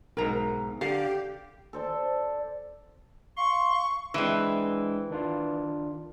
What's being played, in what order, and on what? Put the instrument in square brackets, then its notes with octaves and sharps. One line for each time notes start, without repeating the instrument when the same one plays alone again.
[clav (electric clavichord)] B1 G#2 [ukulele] A#4 A#5
[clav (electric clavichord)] D3 [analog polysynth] G4 [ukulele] F5
[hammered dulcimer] A4 C5 D5
[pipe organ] F5 C6 [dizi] C#6
[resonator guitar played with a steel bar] E3 C4 [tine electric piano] G#3 D4 E6
[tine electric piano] D#3 D4 F4